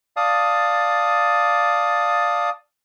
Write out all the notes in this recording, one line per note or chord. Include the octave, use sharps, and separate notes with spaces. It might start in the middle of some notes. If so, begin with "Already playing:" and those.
D5 F5 A5 D#6